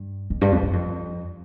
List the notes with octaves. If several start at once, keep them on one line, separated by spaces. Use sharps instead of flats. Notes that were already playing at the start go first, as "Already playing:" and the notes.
Already playing: G2
F2
G2
F2
G2
F2